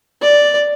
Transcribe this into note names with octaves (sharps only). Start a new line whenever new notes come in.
D5